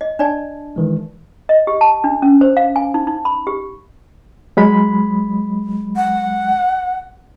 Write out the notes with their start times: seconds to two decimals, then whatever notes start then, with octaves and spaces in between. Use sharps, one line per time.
0.01 D#5
0.19 D4 D5 A5
0.76 D#3 E3 G#3
1.49 D#5
1.67 G4
1.81 A5
2.04 D4
2.22 C#4
2.41 C5
2.57 F5
2.76 G#5
2.94 D#4
3.07 D#4
3.25 B5
3.47 G4
4.57 F#3 G#3 B5
5.96 F#5